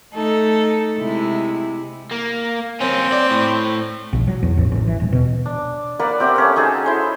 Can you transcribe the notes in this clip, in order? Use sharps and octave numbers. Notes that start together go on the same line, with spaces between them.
A3 D#4 A4
C3 G#3 E4
A#3
A#3 C4 C#4
D5
A2
A#1
F#3
E2
A1
A1
E3
D#1
B2
D4
A#3 B4 D5 F#5
C4 G4 E5 F#5
A3 C#4 F#5
D#4 F#4 G#4 A4
E4 C5